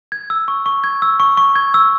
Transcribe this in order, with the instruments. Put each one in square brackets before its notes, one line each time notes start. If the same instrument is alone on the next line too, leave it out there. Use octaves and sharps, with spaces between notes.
[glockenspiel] G#6
E6
C#6
C#6
G#6
E6
C#6
C#6
G#6
E6